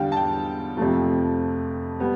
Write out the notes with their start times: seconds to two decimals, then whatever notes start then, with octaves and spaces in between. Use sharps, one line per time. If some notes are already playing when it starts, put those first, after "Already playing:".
Already playing: E2 D3 G3 F5 G5
0.12 A5
0.17 G5
0.77 F2 C3 F3 A3
2.00 G3 B3